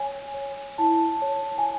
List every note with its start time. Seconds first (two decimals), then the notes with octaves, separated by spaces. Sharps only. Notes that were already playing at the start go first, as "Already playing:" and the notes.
Already playing: C#5 G#5
0.34 C#5
0.78 E4 A5
1.22 C#5
1.58 G#5